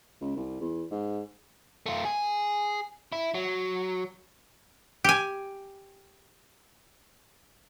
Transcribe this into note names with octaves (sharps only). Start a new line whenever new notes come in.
C#2
C2
E2
G#2
A3 F4
G#4
E4
F#3
G4 G#5